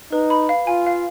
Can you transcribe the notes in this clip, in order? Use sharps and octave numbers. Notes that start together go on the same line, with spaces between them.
D#4 B4
B5
F5
F4 G#5
F5